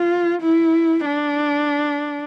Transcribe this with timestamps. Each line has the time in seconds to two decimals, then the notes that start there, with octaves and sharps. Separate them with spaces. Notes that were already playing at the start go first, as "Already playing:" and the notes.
Already playing: F4
0.41 E4
1.06 D4